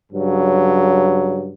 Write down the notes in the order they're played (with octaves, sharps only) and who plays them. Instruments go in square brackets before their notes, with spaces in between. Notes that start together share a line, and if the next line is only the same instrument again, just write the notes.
[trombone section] G2 C#3 F#3